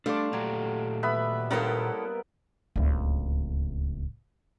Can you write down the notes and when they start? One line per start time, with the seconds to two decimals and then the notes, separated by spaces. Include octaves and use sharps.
0.06 G3 A3 D4 A4 D5 F5 C6
0.33 A#2 F#3 G4 A#5
1.03 B3 E5 B5
1.51 G3 A#3 B3 C#4 E4 A4 A#4
2.76 D1 C#2